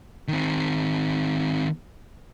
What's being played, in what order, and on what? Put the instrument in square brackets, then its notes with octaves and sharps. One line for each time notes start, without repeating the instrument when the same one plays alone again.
[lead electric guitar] D#3 C4